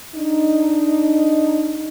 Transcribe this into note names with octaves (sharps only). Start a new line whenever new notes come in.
D4 D#4